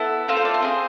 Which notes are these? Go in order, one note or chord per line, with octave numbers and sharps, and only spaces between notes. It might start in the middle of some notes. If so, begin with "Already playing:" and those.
Already playing: B3 E4 A4
A3 C4 F4 A4
C5
D5
C5
C4 G#4